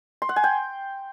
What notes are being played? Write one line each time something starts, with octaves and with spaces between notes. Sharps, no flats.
C6
F#5
G#5
G5